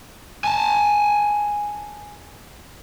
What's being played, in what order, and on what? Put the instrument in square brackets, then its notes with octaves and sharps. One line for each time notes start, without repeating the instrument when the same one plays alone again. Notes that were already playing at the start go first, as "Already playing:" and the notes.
[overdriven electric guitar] G#5 A5